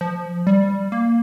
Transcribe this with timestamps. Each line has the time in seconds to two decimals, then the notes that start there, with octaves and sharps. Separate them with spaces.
0.01 F3
0.47 G3
0.92 A#3